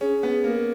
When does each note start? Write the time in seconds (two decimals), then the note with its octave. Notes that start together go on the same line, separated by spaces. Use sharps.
0.01 C#4 G#4
0.23 B3
0.44 A#3